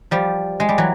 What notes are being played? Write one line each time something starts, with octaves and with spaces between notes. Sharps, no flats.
F3 G3
G#3
G3
E3 F#3